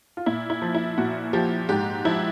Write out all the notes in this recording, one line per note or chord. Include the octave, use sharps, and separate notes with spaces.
F4
A#2 E4
E4
F3
E4
A#2 F#4
F3 G4
G#2 G4
F3 E4